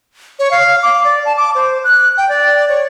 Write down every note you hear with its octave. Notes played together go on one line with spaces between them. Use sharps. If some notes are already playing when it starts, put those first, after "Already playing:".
C#5
F5
D6
D5
A5
D6
C5
F#6
G5
D5
C#5